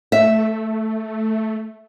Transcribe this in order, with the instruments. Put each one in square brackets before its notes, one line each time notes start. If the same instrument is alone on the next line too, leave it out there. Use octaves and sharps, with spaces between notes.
[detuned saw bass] A3 [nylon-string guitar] E5